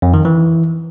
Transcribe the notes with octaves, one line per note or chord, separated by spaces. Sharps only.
F2
D#3
E3